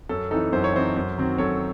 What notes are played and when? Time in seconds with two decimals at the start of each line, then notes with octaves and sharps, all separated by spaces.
0.09 F#2 A4
0.31 E3 C4 D#4 A4
0.53 F#2 C5
0.64 C#5
0.74 E3 C4 D#4 C5
0.96 F#2
1.18 D#3 F#3 C4
1.38 F#2 A4 C#5